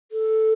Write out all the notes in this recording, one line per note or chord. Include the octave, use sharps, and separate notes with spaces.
A4